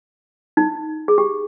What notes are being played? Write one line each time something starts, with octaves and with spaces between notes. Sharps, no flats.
D#4
G#4
G4